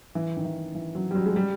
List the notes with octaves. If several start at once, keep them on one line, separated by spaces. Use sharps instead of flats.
E3
D#3
E3
E3
F#3
G3
F#3
G#3
G3